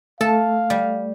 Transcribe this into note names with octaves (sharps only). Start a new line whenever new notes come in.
A3 A4 F5
G3